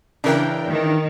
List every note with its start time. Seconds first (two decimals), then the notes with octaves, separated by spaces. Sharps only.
0.24 C#3 E3 D4 A#4 G5
0.67 D#3